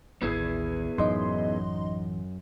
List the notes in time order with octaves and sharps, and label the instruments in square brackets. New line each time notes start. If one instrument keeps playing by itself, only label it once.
[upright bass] A1 D#2 [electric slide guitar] B3 E4 G#4
[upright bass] A1 E3 [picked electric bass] F#2 [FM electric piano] D#4 D#5 C6